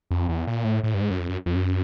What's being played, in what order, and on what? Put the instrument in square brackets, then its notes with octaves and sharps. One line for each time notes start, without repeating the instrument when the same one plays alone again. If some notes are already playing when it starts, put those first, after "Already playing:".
[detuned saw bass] F2
E2
A#2
A2
A2
G2
G#2
F#2
F2
F#2
F2
F#2